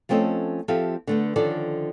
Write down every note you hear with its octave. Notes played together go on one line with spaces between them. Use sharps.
F3 A3 C4 C#4 A4 D#5
F3 C4 G4 A4 E5 F5
D3 A3 B3
D3 D#3 F3 C#4 A4 D5